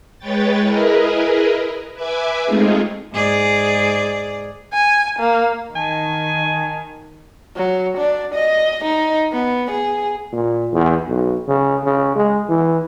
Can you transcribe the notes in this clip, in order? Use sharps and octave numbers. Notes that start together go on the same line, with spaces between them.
G#3 B4 C#5 G5 A6
E4 G#4 A#4 B4 D#5
B4 E5 G#5 D6 G#6
G#3 A3 C4 D#4 F4 G#4
G#2 G#4 D5
G#5
A#3
D#3 G#5 A5
F#3
D4
D#5
D#4
B3
G#4
A#2
E2
B1
C#3
C#3
G#3
E3